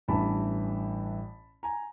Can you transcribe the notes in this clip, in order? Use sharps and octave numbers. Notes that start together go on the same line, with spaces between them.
A1 G2 E3 A5 B5
G#5 A#5